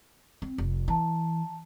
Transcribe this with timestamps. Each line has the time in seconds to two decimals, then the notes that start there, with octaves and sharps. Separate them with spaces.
0.42 C4
0.58 F1
0.88 E3 A5 A#5